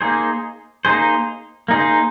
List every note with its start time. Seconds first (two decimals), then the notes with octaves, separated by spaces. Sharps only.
0.01 A#3 D#4 G#4 C5
0.85 A#3 D#4 G#4 C5
1.68 A#3 D#4 G#4 C5